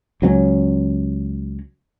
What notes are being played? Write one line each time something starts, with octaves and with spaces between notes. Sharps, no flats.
C#2 F#3 C4 C#4